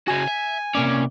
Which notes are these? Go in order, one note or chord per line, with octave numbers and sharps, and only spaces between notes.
C#3 F#4 G#5
E5
C3 A#3 C#4 D5